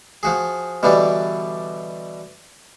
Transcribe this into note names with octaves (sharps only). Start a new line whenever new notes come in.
F3 F#4 G#4
B2 D3 E3 G3 D4